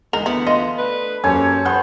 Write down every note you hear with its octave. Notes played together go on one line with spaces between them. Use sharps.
D3 E3 G#3 D#4 A#4 F7
D2 E3 B3 E4
F4 D#5
A3 D4 B4
F#2 A#3 G4 A4 C5 C#5 G#5
B3 C5 F#5 G6